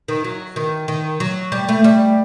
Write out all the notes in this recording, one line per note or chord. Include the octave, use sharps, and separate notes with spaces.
D#3
F#3
D#3
D#3
F#3
G3
A3
G3